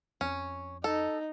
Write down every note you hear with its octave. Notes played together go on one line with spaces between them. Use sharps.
F2 C#4
D#4 A4